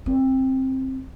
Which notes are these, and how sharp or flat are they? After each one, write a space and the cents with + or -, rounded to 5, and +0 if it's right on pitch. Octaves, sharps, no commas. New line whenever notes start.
C4 +15